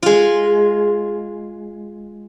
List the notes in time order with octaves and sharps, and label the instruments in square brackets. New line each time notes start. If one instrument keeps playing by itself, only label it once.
[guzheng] G#3 F4